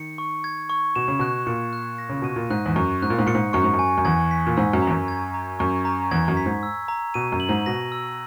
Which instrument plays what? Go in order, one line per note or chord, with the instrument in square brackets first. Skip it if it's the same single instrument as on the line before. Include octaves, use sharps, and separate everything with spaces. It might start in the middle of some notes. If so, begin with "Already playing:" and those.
Already playing: [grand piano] D#3 [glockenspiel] C#7
[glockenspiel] C#6
G#6
C#6
[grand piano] B2 [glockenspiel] E7
[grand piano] C#3
[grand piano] B2 [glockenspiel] F#6
[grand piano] A#2 [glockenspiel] C#7
[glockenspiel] F#6
A#6
[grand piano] C#3
[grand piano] B2 [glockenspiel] D#7
[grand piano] A#2
[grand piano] G#2 [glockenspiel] F#6
[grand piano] E2
[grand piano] F#2 [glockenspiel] C#6
[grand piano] G#2 [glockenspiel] F#6
[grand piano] A#2
G#2
[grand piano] A#2 [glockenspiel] C#7
[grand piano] G#2
[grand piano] F#2 [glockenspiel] C#6
[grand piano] G#2
F#2
[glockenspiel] G#5
[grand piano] F#2
[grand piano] E2 [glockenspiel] G#6
[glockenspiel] B6
[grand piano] A#2
[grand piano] G#2 [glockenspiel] E6
[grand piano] F#2
[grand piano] E2 [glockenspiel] A#5
[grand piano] F#2
[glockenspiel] G#6
A#5
[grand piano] F#2 [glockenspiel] C#6
[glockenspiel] A#5
[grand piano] E2 [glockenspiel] G#6
[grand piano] F#2
[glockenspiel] B6
[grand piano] G#2
[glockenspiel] E6
A#5
[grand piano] B2 [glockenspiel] D#7
[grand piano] F#2
[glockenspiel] F#7
[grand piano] G#2
[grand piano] B2 [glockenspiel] A#6
[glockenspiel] E6